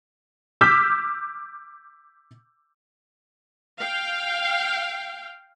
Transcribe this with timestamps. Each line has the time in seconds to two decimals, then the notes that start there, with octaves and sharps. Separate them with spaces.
0.61 D6 E6 F6 G6 B6
3.79 F5 G5